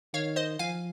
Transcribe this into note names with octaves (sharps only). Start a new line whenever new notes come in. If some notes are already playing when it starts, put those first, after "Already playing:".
D#3 C#5 F5
C5 D#5
F3 F5 G#5